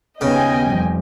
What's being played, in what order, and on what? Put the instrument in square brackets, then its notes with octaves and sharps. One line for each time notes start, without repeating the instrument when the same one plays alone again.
[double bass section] D#2 B3 [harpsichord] C#3 [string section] D#5 G5 G#5
[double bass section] F1 F2 G3